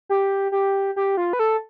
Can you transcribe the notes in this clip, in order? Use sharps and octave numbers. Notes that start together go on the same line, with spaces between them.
G4
G4
G4
F4
B4
A4